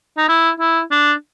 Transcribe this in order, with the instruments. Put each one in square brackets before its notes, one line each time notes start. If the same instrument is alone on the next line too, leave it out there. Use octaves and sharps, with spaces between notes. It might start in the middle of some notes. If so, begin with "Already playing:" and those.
[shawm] D#4
E4
E4
D4